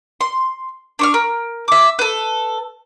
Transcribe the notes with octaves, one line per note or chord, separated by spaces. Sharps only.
C6
D4 C#6 F6
A#4
E5 D6
A4 B4